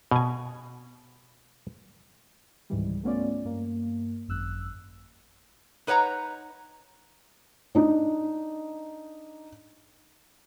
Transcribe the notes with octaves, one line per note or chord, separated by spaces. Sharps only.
B2 G#5
C#2 G#2 D#3 E3 G3
A3 B3 C#4 F4 D5
G2 A#3
G#1 F#2 E6 F#6
D#4 B4 C#5 F#5 A#5
D4 D#4